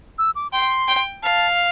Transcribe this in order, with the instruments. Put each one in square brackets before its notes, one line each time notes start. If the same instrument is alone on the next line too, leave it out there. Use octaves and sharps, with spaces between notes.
[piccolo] E6
D6
[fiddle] G5 [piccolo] C6
[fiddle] G5
[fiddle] F5 [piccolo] A5